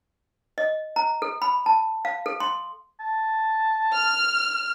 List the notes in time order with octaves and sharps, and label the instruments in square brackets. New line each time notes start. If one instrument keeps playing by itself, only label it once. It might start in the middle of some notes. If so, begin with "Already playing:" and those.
[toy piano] D#5
A#5
A4
B5
A5
F5
A4
C6
[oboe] A5
[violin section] F6